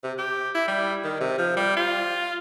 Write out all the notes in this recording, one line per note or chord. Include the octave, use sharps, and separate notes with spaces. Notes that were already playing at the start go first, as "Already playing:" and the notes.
C3
G4
E4
G3
D#3
C3
F3
G3
F4